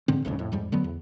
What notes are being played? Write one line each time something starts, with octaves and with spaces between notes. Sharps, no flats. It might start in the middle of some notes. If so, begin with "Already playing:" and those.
G#2 D3 C4
F#1 D2 G#2 C#3
F2 A2
F2 G#2 G3
D3 F#3 A3 B3
E2